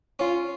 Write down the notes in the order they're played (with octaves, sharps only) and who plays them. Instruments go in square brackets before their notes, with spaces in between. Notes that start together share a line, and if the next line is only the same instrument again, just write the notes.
[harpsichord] C#4 [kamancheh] F4